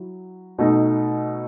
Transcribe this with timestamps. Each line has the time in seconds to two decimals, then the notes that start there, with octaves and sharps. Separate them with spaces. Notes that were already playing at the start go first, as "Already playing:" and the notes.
Already playing: F#3 E4
0.58 B2 A3 D#4